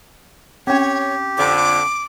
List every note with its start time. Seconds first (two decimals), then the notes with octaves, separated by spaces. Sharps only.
0.67 C4 C#4 G4 C#5
1.38 F2 D3 D6